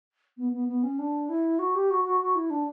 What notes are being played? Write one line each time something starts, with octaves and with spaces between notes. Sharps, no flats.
B3
B3
B3
C#4
D4
E4
F#4
G4
F#4
F#4
F#4
E4
D4